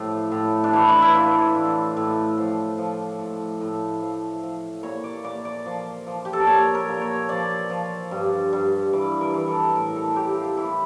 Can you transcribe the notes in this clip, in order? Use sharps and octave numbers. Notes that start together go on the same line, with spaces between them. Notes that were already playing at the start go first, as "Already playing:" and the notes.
Already playing: A2 F3 F4 G4
A2
D4
E3 E4
D4
E4
E3 F4
A2
A2
F3
F3
A2
A2
F3
F3
A#2 C#5
D5
A#2 D5
D5
F3
F3
G4
A4
A#4
A#2 C#5
A#4
A#2
C#5
F3 D5
F3
G2
G2
E3 D5
A#4
E3
A4
A2 A#4
A4
A2 G4
F4
E3 E4